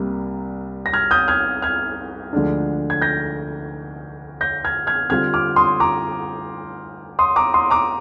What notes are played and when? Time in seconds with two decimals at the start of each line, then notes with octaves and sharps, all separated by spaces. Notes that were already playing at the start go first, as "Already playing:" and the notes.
Already playing: C2 C3 G3 A#3
0.86 A#6
0.93 F6 G#6
1.11 D#6 G6
1.28 F6 G#6
1.62 F6 G#6
2.33 D2 D3 F3 G#3 D4
2.90 G#6
3.01 G6 A#6
4.41 G6 A#6
4.64 F6 G#6
4.87 F6 G#6
5.10 D3 G3 C4 F4 F6 G#6
5.34 D6 F6
5.56 C6 D#6
5.80 A#5 D6
7.19 C6 D#6
7.36 A#5 D6
7.54 C6 D#6
7.70 A#5 D6